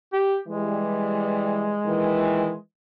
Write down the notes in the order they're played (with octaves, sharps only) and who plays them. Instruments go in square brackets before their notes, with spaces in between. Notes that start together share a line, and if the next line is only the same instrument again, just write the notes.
[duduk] G4
[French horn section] E3 G3 [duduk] G#3
[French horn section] A#2 D#3 E3